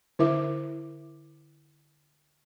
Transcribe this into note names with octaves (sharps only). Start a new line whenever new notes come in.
D3 E4 A#4 E5 D6